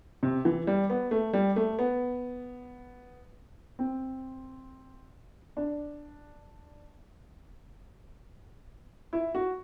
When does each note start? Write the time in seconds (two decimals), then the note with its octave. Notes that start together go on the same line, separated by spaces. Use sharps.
0.23 C3
0.45 E3
0.67 G3
0.90 B3
1.11 A3
1.33 G3
1.56 A3
1.79 B3
3.79 C4
5.57 D4
9.13 E4
9.35 F#4